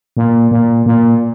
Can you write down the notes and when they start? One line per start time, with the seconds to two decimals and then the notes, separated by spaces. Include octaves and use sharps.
0.17 A#2
0.51 A#2
0.86 A#2